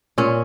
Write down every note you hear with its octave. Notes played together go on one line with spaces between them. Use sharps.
A#2 C#4